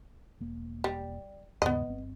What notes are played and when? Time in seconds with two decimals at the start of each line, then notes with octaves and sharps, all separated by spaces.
0.40 E1 A#3
0.84 G3
1.62 D#2 G#2 C#3 B3 D#5
1.87 G1 C4